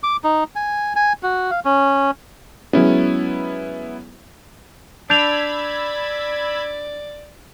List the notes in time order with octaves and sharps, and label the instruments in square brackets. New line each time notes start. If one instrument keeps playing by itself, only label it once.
[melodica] D6
D#4
G#5
G#5
F#4
F5
C#4
[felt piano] F#3 G#3 C#4 [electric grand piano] B3 E4
[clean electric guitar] D4 [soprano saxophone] D5 [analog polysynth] B5 E6 G#6 [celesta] G6 F7